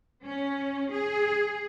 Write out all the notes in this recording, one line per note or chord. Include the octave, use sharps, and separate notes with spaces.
C#4
G#4